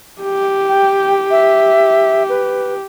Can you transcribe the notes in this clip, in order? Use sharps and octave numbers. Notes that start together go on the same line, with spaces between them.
G4
G5
E5
B4